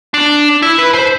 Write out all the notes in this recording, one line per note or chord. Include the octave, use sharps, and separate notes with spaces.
D4
E4
B4
C5